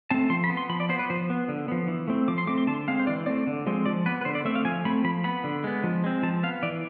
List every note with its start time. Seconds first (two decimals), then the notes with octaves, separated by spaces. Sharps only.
0.11 A3 C4 A5
0.30 F3 C6
0.44 B5
0.50 B3
0.57 C6
0.69 F3 B5
0.80 D5
0.89 B3 C5
0.99 B4
1.10 F3 C5
1.30 B3
1.49 D3
1.68 F3 B3
1.88 E3
2.08 A3 C4
2.28 F3 D6
2.38 C6
2.47 A3 C4 D6
2.58 C6
2.67 D3 A5
2.88 G#3 C4 F5
2.99 C5
3.07 E3 D5
3.26 A3 C4 D5
3.47 D3
3.66 F3 G#3 C4
3.85 F3 D5
4.06 B3 B4
4.21 B4
4.25 D3 C5
4.35 D5
4.45 A3 C4 E5
4.55 F5
4.65 F3 G#5
4.85 A3 C4 B5
5.04 F3 B5
5.24 B3 B5
5.44 D3
5.64 G#3 B3
5.83 F3
6.04 G#3 C4
6.23 F3 A5
6.43 B3 F5
6.63 E3 D5